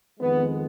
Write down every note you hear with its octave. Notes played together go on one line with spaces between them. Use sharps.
F2 D#3 G#3 B3